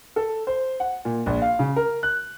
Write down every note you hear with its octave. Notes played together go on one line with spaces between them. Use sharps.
A4
C5
F#5
A#2
A#1
F5
C#3
A#4
F#6